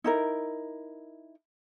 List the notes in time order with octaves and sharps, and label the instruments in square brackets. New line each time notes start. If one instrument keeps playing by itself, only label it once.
[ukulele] D#4 E4 A#4